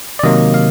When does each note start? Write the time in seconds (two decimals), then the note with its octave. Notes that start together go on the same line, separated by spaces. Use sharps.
0.19 D5
0.23 C3 D#3 F#3 A#3 D#5
0.54 F5